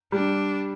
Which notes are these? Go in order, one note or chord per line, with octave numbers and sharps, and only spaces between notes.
G3 D4